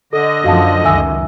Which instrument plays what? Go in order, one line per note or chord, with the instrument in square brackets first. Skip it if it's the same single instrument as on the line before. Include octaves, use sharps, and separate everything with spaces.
[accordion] D3 D#5 [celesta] A4
[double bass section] F#2 F3 [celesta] F#4 F5 A5
[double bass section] C#2 F#2 D#3 [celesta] E5 G#5 E6